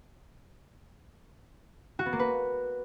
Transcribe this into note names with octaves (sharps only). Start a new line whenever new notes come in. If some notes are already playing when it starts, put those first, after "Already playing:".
F#4
B3
A#3
B4